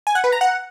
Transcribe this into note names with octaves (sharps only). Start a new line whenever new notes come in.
G#5
F#5
B4
A#5
F#5